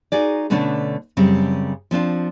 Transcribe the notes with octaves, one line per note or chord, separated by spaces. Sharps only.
D#4 F#4 G#4 D5
B2 D3 A3 B3 C#4 D4
F#2 C#3 G3 C4
F3 C4 D4 F4